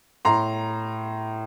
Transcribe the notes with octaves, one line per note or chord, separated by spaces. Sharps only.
A2 A#5 C6